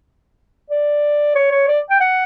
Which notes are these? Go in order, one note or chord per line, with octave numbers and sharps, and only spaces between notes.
D5
C#5
C#5
D5
G5
F#5